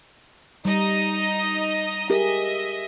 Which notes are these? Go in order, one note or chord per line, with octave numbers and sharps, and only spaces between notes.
G3 D#4 D#5 A#5
G4 G#4 A#4 D#5 E5